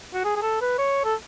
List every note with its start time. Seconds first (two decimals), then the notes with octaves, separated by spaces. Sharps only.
0.14 F#4
0.25 G#4
0.36 G#4
0.42 A4
0.61 B4
0.78 C#5
1.05 A4